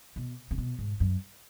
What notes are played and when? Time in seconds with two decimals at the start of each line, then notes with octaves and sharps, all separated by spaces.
0.16 B2
0.51 C#3
0.58 B2
0.79 G#2
1.00 F#2